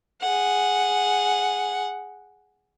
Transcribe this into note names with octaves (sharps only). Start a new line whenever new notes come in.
G#4 F#5